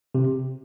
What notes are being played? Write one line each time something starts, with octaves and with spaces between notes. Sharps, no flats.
C3